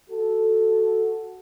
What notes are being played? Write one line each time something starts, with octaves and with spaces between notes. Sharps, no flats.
F#4 A4